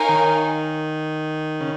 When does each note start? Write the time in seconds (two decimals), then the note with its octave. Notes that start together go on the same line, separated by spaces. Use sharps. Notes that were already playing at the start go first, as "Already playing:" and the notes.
Already playing: D#4 A#4 C#5 F5 G#5
0.09 D#3
1.61 C#3